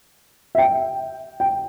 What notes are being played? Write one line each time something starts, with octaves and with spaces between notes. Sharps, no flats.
E5
G5
G5